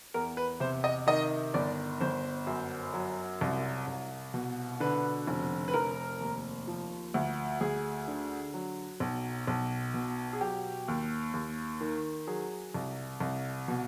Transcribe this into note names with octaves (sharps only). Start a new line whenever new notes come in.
E2 A#4
B4
C3 C5
D#5
D#3 D#5
G1 D5
G1 C5
F#2
F#3
C2
C2
B2
D3 B4
F1
B4
F1 A#4
D#2
F3
D2
D2 G#4
D3
F#3
B1
B1
B2
G#4
F#3 G4
D#2
D#2
D#3
F#3 G#4
C2
C2
B2